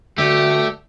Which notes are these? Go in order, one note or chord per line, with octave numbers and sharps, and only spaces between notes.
G2 B2 D3 A3 F#4 G4 D5